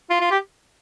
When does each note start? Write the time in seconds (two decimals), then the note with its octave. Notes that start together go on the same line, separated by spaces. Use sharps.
0.10 F4
0.21 F4
0.31 G4